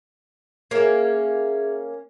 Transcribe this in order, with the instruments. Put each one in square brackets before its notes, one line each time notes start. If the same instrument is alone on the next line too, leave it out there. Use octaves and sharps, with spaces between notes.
[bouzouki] A#3 C#4 [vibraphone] G#4 E5